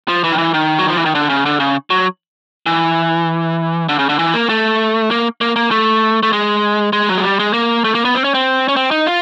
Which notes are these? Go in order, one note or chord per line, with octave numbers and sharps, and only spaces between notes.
F3
E3
D#3
E3
D#3
F#3
F3
E3
D#3
D3
C#3
D3
C#3
F#3
E3
D3
C#3
D3
E3
A#3
A3
A#3
A#3
A#3
A3
A3
G#3
G#3
F#3
G#3
G3
G#3
A#3
A3
A#3
B3
C4
C#4
C4
C#4
C4
D#4
F4